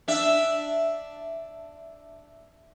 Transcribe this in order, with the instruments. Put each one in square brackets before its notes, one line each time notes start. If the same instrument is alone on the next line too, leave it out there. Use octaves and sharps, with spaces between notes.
[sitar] D4 E5